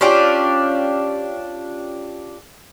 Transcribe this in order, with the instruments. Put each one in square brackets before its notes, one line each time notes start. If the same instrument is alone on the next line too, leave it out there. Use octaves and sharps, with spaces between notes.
[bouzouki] C#4 D4 F4 G4